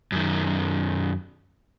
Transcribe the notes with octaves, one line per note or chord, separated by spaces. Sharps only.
F#2 D#3